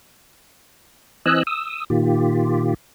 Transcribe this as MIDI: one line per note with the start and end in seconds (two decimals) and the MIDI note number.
1.26 1.43 52
1.26 1.43 60
1.26 1.43 75
1.26 1.43 80
1.26 1.43 88
1.26 1.43 90
1.47 1.84 87
1.47 1.84 88
1.90 2.74 46
1.90 2.74 51
1.90 2.74 65
1.90 2.74 67